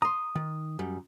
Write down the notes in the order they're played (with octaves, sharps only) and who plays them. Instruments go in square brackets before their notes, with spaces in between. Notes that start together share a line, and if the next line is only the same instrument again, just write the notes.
[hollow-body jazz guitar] A#5 C6 [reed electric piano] D#6
[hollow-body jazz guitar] D#3
F#2 G3